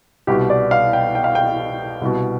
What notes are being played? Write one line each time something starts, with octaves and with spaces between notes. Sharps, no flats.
C2 B2 G4
D5
F5
G5
G5
F5
G5
C2 B2